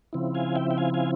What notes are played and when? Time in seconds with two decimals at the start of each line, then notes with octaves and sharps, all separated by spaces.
0.13 C#3 F3 C4 E4
0.35 F5 G#5
0.56 E5 G5
0.71 G5
0.78 F5 G#5
0.94 F5 G#5